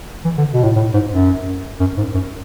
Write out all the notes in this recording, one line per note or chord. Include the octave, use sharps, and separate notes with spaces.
E3
D3
B2
A2
A2
G#2
F#2
F#2
G#2
F#2